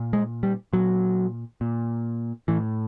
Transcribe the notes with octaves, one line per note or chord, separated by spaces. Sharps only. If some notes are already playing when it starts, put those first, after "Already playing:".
Already playing: A#2
G#3
G3
A#2 F#3
A#2
A2 E3